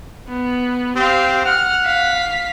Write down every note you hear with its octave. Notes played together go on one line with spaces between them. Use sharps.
B3
C4 G4 F5
F#5 F6
F5 B6